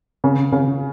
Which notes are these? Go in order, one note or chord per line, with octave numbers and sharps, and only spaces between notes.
C#3
C#3